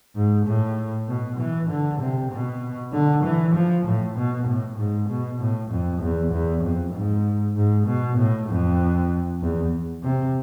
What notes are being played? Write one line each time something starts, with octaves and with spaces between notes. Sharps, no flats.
G#2
A2
B2
E3
D3
C3
B2
D3
E3
F3
A2
B2
A2
G#2
B2
A2
F2
E2
E2
F2
G#2
G#2
B2
A2
F2
E2
C3